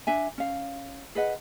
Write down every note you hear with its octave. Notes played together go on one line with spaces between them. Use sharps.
D4 E5 G#5
C#4 F5
G#4 B4 D#5 F#5